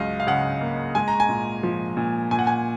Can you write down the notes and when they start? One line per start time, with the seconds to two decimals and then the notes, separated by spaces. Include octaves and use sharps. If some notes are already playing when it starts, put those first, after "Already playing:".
Already playing: C#2 F#3 D#5 F5
0.20 F5
0.27 C#3 F#5
0.61 A#3
0.95 G#3 G#5
1.08 A#5
1.20 G#5
1.29 A#2
1.63 F3
1.97 A#2
2.31 A#2 G#5
2.39 F#5
2.47 G#5